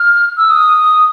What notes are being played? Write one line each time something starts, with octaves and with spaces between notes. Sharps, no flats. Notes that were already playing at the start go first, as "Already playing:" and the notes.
Already playing: F6
E6
D#6